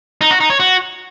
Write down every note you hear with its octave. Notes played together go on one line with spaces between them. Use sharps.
D#4
F#4
D#4
C#5
F#4